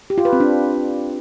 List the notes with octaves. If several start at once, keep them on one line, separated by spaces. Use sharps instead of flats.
G4
F4
B4
C4
D4